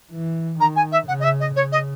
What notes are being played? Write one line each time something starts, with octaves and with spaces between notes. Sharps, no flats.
E3
D#3 A#5
G#5
E5
C#3 F#5
D#5
E5
D#5
C#3 C#5
D#5